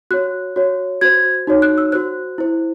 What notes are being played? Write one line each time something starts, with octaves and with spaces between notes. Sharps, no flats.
F#4 C#5 F#6
F#4 C#5
F#4 C5 G#6
D#4 F#4 C#5
F#6
E6
F#4 C5 F#6
E4 C5